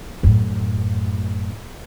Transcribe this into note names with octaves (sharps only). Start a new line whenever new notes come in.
F#2 A2